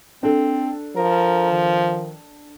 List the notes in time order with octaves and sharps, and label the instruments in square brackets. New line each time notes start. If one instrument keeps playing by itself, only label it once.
[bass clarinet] C4 [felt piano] D4 A4
[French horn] F3 [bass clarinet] A#4
[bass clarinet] D#3